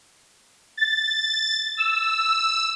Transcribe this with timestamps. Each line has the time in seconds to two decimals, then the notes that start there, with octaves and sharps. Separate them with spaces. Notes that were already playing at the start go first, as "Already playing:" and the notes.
0.77 A6
1.77 E6